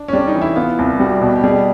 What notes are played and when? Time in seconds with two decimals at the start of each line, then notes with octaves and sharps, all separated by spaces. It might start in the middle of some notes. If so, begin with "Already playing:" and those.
Already playing: D4
0.08 C#4
0.13 G3 D4
0.27 D#4
0.35 E3
0.41 E4
0.56 B3 F4
0.79 C2
1.00 G3 F#4
1.22 B2
1.35 G4
1.44 G3 G#4